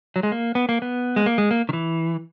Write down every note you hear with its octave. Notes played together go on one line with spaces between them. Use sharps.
F#3
G#3
A#3
B3
A#3
B3
G#3
A#3
G#3
A#3
D#3
E3